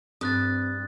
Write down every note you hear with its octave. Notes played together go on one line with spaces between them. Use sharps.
G2 C4 D#6 F#6 A6